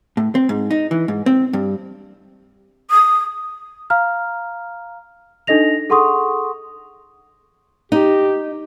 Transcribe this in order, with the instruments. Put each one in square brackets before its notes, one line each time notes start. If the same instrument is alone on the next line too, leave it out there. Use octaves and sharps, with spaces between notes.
[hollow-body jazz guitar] A2
C4
G#2
D#4
E3
G#2
C4
G2
[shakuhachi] D#6
[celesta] F5 A#5 F6
D4 D#4 A4 D#5 A#6 F7
G#4 A4 F#5 C6 C#6 D#6
[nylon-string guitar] D#4 [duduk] G4